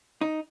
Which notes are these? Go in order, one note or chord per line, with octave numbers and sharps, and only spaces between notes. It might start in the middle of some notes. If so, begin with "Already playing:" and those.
D#4